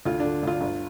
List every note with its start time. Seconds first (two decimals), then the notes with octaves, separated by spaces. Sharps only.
0.05 D2 F4
0.20 D4
0.25 D3
0.43 D2 F4
0.61 G1